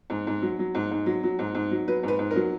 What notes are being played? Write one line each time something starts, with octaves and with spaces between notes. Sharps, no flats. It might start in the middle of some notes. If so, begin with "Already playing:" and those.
G#2
G#2
F#3
F#3
G#2
G#2
F#3
F#3
G#2
G#2
F#3
F#3 B4
G#2 B4
G#2
A#4
F#3